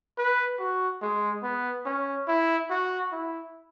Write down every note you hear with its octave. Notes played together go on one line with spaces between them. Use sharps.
B4
F#4
G#3
B3
C#4
E4
F#4
E4